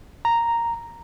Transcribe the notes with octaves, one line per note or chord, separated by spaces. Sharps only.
A#5